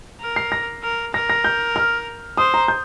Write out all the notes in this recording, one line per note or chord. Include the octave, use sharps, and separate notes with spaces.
A#4
C7
A#6
A#4
A#4 A#6
A#6
G6
F6
C5 D#6
A#5
G6